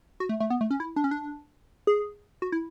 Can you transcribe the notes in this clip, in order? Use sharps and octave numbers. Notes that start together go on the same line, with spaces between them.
F#4
A3
A3
B3
A3
C#4
E4
D4
C#4
D4
G#4
F#4
E4